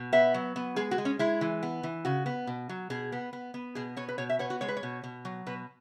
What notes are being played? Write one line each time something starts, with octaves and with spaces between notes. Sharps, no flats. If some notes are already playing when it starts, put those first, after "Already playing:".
Already playing: B2
B3 E5
F#3
B3
G#3 G#4
F#4
G#3
C#4
G#3 E4
E3
B3
E3
C#3 F#4
B3
B2
F#3
B2 G#4
B3
B3
B3
B2 G#4
B3 C#5
B4
B2 C#5
E5
B3 C#5
F#4
G#3 C#5
B4
C#5
B2
B2
F#3
B2 B4